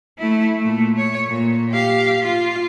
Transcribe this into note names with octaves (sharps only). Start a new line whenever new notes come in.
A3 E4
A#2 A3
C#5
A#2
G4 F5
F4